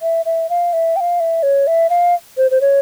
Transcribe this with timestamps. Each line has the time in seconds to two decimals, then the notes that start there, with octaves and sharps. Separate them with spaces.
0.02 E5
0.26 E5
0.50 F5
0.73 E5
0.96 G5
1.00 F5
1.20 E5
1.43 C#5
1.67 E5
1.90 F5
2.37 C5
2.51 C5
2.61 C#5